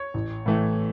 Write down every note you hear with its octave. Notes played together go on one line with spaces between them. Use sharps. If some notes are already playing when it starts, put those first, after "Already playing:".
Already playing: C#5
A1
A2 E3 A3